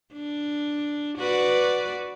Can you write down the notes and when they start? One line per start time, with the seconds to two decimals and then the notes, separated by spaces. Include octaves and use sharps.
0.13 D4
1.18 F#4 B4 D5